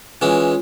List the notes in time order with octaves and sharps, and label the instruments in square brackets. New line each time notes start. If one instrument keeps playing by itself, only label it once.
[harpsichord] E3 G#3 C#4 F#4 [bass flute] F4